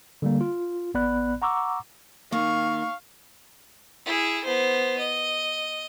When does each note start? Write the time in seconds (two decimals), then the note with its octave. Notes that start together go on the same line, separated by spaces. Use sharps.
0.22 D3 G3 A#3
0.41 F4
0.94 A1 B3 D5 B5 F#6
1.42 F#5 A#5 C#6 D6 E6
2.32 D#3 A#3 F5 C#6
4.06 E4 G#4
4.44 B3 C5
4.98 D#5